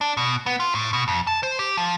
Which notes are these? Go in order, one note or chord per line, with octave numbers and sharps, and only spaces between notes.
D4
B2
B3
F4
A2
B2
F2
A5
C5
G4
F3